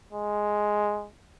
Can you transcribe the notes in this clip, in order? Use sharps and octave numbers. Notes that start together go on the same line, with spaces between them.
G#3